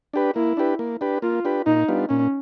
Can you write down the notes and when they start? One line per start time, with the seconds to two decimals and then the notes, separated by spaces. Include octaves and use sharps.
0.14 D4 G4 B4
0.35 A#3 E4
0.57 D4 G4 B4
0.79 A#3
1.01 D4 G4 B4
1.22 A#3 F4
1.45 D4 G4 B4
1.66 A#2 D#4
1.88 G3 B3 D4 F4
2.09 A#2 C#4